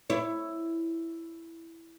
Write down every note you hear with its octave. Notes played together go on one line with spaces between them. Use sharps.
E4 C#5